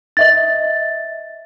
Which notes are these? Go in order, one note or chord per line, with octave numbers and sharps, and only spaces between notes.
D#5 E5 A6